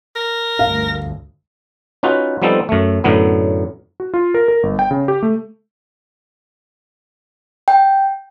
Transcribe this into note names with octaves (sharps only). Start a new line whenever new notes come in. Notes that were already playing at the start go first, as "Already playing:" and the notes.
A#4
G1 D2 F5
C#4 D#4 F4 F#4 B4
F3 G3 B3 C4 D#4 A4
F#2 A3
F#2 A2 D3 F#3 B3
F#4
F4
A#4
A#4
G1
G5
C#3
G4
A3
G5